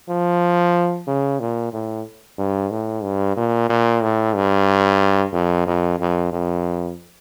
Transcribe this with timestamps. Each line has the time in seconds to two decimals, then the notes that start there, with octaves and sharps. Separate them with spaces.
0.09 F3
1.07 C#3
1.40 A#2
1.73 A2
2.38 G2
2.71 A2
3.03 G2
3.37 A#2
3.70 A#2
4.02 A2
4.35 G2
5.33 F2
5.67 F2
6.00 F2
6.32 F2